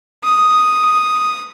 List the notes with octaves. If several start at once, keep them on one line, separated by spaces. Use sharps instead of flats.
D#6